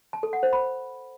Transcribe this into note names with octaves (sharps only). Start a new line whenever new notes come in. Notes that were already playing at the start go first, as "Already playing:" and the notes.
A5
A4
F#5
C5
B5